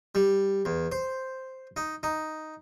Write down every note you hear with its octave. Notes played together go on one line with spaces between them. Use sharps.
G3
E2
C5
D#4
D#4